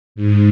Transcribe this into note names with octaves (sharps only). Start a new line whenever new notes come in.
G#2